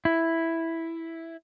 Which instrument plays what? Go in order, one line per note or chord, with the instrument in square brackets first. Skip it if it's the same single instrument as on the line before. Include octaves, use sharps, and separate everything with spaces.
[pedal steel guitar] E4